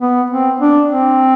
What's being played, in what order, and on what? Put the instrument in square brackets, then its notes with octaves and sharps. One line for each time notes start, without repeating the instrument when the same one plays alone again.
[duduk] B3
C4
D4
C4